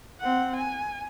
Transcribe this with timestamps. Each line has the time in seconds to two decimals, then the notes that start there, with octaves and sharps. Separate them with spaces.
0.20 C4 F#5
0.56 G#5